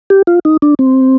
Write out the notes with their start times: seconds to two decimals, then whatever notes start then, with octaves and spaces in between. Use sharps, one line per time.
0.10 G4
0.27 F4
0.45 D#4
0.62 D4
0.79 C4